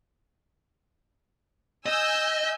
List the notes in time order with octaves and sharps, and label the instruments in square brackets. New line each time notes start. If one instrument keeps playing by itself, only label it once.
[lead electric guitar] D#5 [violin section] G#5 E6 G6